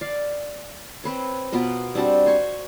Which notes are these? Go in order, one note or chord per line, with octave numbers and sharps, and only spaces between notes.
D5 F5
C4 B4 C#5
B2 B3 F4 A#4
G3 C4 D4 F#4
C5 G#5 C#6